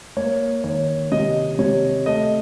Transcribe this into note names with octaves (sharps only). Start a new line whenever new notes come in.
A#3 C#5
D#3 C#5
C3 D#5
C3 C#5
A3 D#5